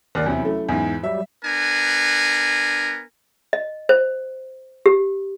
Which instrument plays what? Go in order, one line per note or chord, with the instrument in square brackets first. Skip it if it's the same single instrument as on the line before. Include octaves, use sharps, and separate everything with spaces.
[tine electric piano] G#1 D#3 F5 [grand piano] D#2 D5
[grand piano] E2 C3 [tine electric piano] F#3 C#4 E4
[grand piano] A3
E2 G#2
[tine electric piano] F#3 G3 [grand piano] E5
[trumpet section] B3 D4 A#4 G#5
[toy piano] D#5
C5
G4